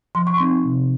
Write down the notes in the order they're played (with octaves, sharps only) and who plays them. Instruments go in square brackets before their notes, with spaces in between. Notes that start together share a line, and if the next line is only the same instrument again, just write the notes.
[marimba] F3 C6
C#6
C4 D#4 C6
C3